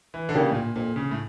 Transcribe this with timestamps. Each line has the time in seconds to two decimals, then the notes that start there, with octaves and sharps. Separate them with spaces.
0.14 E3
0.29 D3
0.34 C#3 E3 A#3 D4 G4
0.50 A2
0.55 A#2
0.75 F2 A#2
0.96 C#3
1.11 A2